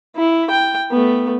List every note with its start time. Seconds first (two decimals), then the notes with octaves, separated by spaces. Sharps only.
0.16 E4
0.50 G5
0.91 A3 B3